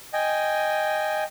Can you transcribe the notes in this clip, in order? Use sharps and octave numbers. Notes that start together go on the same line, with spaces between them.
D#5 G5 G#5